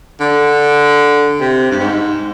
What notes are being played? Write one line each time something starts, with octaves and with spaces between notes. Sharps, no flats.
D3
C3
G2
G#2